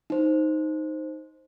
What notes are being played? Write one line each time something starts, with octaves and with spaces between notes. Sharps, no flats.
D#4 C5